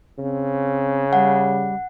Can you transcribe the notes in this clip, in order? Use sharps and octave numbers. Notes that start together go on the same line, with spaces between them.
C#3 C4
G3 F#5